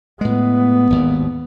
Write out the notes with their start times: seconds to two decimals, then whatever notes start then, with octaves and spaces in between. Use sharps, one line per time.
0.21 A2 G#3 B3
0.90 G#1 D#2